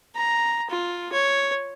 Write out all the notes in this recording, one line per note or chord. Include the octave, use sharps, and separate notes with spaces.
A#5
F4
C#5